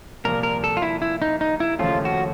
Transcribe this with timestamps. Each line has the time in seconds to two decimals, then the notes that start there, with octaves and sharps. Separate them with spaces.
0.24 C2 A#2 F3 A#3 A#4
0.43 A#4
0.64 A4
0.77 F4
0.82 E4
1.02 E4
1.22 D#4
1.41 D#4
1.60 E4
1.79 D#2 C#3 F3 A3 C#4 F4
2.05 F#4